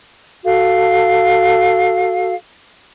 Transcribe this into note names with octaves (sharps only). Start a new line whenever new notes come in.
F#4 A4 F5